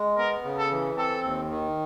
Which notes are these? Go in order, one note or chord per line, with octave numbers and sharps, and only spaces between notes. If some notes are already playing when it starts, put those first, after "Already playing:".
Already playing: G#3
B3 A#4
C#3
A4
E3
C4 A4
D#2
D#3